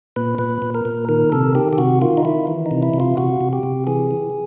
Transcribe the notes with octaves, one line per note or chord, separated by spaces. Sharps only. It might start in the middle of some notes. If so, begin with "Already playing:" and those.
A#2 B4
A#2 B4
A#2
A#4
A#2
D#3 A#4
C3 A4
D#3 G4
G4
C3 F#4
D#3 F4
D#4
D#3 E4
E3
D#4
C3
E4
C3
F4
C3 F#4
C3
G4
C3
E3 G#4
E3